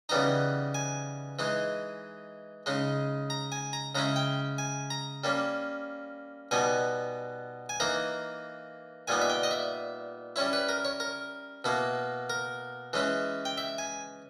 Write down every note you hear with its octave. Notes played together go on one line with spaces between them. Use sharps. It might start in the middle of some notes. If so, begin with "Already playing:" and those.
C#3 E3 G3 B3 D#4 A#5
G#5
E3 G#3 D#4
C#3 G#3 D#4
A#5
G#5
A#5
C#3 G#3 C#4 E4 A#5
G5
G#5
A#5
G3 A#3 C#4
B2 G3 B3 D#4 G#5
G#5
E3 A#3 D#4 A#5
A#2 G3 B3 D#4 G#5
E5
G5
D#5
E5
G3 C#4 E4 C#5
B4
A#4
C#5
A#4
B2 A#3 E4
A#4
E3 G#3 C#4 E4
G5
E5
G#5